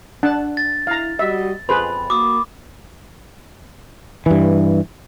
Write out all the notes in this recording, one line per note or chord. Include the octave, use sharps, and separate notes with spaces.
D4 F#5 A5
A6
E4 F5 A#5
G3 F#4 D#5 E5
F2 G#4 B4 C5 B5
A#3 F#4 D6 D#6
G2 E3